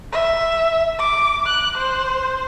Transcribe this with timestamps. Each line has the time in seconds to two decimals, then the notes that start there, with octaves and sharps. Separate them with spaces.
0.12 E5
0.99 D6
1.46 F#6
1.77 C5